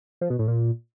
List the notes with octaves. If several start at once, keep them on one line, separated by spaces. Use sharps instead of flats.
F3
B2
A2
A#2